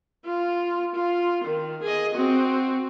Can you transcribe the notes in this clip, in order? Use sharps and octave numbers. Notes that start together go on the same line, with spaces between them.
F4
F4
D#3
G#4 D#5
C4 F#4